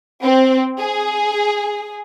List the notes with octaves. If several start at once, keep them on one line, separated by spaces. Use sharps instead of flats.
C4
G#4